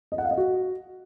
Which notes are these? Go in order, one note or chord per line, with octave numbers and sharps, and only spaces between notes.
D#5
F#5
F5
D#5
F#4